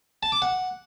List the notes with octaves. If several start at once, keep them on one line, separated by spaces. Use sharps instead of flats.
A5
D6
F#5